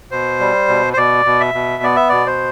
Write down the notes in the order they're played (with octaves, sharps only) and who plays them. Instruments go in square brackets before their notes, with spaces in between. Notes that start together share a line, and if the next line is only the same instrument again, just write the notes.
[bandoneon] B2 C5
G3
B2
C5
B2 D5
B2
E5
B2
B3 D5
E5
B2 D5
C5